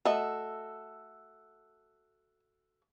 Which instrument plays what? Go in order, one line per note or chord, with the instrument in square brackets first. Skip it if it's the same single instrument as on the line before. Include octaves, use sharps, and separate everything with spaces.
[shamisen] A3 D#5 [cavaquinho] F#4 A4 E5